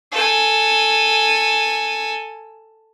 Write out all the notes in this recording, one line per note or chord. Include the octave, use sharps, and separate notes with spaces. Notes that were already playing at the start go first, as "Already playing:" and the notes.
A4 G#5